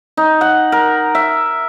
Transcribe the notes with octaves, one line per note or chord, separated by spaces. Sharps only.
D#4
F#5
A#4
E5